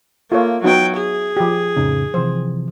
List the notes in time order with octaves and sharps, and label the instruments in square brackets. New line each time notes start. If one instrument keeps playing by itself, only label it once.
[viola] A#3 [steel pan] F4 A4 C#5 [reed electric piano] E5
[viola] F#3 G5 [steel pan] B3 D#4 F#4
[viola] G#4
[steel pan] F3 G4
[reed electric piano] F2 A2 C#3 [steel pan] D#4
[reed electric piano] C3 E3 F3 [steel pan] C5